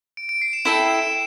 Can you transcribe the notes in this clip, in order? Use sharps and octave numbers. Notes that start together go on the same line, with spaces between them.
D7
D7
C7
E7
E4 A4 E5 G5 E7